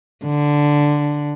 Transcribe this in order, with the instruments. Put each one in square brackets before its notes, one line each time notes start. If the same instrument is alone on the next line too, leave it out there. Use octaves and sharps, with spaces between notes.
[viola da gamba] D3